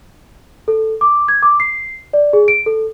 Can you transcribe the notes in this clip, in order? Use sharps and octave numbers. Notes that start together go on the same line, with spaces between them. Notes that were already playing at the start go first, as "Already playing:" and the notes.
A4
D6
G#6
D6
C7
D5
G#4
D7
A4